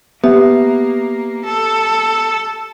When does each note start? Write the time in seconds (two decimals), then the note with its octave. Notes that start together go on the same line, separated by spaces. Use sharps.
0.24 A#3 B3 G4 E5
1.45 A4